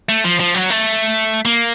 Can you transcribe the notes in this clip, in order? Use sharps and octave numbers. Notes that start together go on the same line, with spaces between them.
A3
F3
F3
F#3
A3
A#3